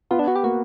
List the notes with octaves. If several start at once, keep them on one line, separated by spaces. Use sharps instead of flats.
B3 F4
D4
F#4
G4
A#3 F#4